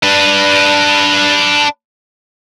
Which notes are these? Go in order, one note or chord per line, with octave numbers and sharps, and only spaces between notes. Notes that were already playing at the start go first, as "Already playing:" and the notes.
D4 B4